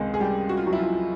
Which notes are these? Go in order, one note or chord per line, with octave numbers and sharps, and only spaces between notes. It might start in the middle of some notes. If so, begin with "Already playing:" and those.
Already playing: C#2 C3 D#3 G#3 G#4
G#4
G3 G4
F#4
F4
F#3 F#4
E4
F3 F4